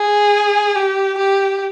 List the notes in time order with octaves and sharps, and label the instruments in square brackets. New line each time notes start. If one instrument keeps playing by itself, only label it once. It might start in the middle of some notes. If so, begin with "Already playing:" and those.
Already playing: [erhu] G#4
G4
G4